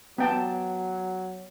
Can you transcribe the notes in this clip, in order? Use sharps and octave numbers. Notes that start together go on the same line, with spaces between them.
F#3 B3 G5 A5